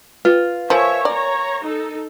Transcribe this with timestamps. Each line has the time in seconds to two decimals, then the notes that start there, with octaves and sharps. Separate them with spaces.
0.25 F4 B4
0.70 F3 A#4 C#5 E5 G#5
1.05 C#5 D5 A#5
1.63 D#4 A4